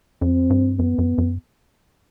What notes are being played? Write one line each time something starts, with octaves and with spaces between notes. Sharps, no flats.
F2 C4
G2
F#2 B3
F#2
F#2